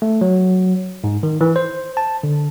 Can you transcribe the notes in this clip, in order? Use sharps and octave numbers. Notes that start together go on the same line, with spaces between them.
A3
F#3
G#2
D#3
E3
C5
A5
D3